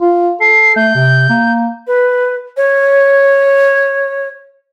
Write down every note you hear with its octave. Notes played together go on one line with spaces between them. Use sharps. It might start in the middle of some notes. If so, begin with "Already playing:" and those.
F4
A4 C7
A3 G6
C3
A#3
B4
C#5